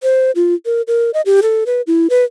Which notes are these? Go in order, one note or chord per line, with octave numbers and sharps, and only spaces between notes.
C5
F4
A#4
A#4
D#5
G4
A4
B4
E4
B4